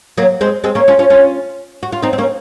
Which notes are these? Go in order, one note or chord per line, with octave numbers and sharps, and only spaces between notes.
F#3 A#3
G#3 C4
G#3 C4
A#3 C#4
C#4 F4
C#4 F4
C#4 F4
F#4
F4
C4 D#4
C4
A#3 C#4